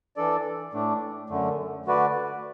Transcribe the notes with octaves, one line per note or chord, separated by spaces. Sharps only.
E3 D4 A4 D5
A2 A3 D4
F#2 D3 A3
D3 A3 F#4 B4 D5